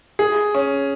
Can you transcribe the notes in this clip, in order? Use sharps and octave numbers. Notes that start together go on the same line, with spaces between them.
G#4
C#4